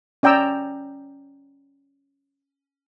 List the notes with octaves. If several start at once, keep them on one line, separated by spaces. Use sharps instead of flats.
C#4 D5 G5 A#5 E6